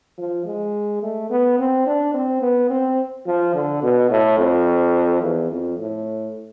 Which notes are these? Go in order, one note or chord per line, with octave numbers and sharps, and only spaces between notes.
F3
G#3
A3
B3
C4
D4
C4
B3
C4
F3
D3
B2
A2
F2
E2
F2
A2